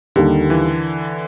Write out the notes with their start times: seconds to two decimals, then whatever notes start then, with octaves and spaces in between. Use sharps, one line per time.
0.16 D#2 D3 D#3 G3
0.50 E3